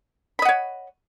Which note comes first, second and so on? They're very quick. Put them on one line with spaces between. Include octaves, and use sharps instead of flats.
B5 D#5 F#5 C#5